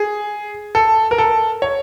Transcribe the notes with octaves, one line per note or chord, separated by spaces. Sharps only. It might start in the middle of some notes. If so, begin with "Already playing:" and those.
Already playing: G#4
A4
A#4
A4
C#5